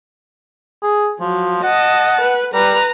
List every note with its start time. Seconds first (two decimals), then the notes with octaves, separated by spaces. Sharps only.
0.82 G#4
1.20 F3 F#3
1.63 D#5 F#5 A5
2.21 B4
2.54 G3 B4 A#5